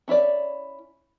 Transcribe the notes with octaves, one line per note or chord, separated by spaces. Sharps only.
C#4 E4 C#5 D5